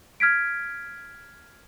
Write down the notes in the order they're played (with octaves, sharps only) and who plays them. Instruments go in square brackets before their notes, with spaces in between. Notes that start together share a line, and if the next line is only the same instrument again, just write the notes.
[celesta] F6 G#6 B6 D7